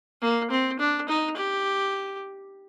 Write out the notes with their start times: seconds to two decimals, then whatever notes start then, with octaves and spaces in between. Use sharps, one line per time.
0.22 A#3
0.51 C4
0.80 D4
1.09 D#4
1.37 G4